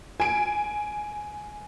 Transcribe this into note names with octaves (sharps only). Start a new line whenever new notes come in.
G#5 D7